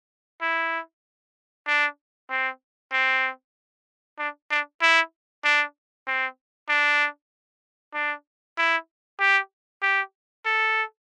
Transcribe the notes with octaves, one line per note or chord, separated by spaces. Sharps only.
E4
D4
C4
C4
D4
D4
E4
D4
C4
D4
D4
E4
G4
G4
A4